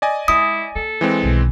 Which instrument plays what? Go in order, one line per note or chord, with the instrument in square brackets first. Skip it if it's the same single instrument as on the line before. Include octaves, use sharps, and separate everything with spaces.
[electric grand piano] D5 D#5 G#5
[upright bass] G#3 [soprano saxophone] E4 [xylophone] D#6
[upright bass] A#3 [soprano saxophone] A4
[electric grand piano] E3 G#3 C4
[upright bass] B1 D#3